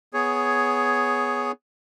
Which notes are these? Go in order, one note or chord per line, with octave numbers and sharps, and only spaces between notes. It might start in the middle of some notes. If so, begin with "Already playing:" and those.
B3 G#4 C#5